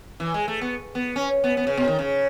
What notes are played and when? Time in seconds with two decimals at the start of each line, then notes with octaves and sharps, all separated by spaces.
0.20 E3
0.34 G#3
0.48 A3
0.62 B3
0.95 B3
1.16 C#4
1.44 B3
1.57 B3
1.67 C#3
1.77 B2
1.88 D#3
1.99 C#3